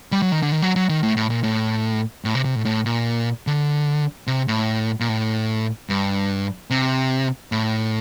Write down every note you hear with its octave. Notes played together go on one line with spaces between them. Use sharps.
G3
F#3
D#3
D3
D#3
F#3
F#3
D#3
A2
A2
A#2
A2
A2
C3
C3
A2
A2
A#2
D3
C3
A2
A#2
A2
G2
C3
A2